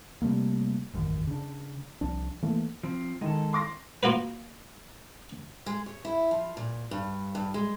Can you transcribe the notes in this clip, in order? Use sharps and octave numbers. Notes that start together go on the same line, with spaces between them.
C3 G3 A3 A#3
E1 A1 F#2 D#3
C#3 D4
C2 F3 D4
E3 A3 A#3
F3 C4
D#3 G#3 D#4 A4
C6 D6 A#6
A#3 F4 F#4 B4
G#3
C#5
E4
F3
A#2
G2
G2
G#3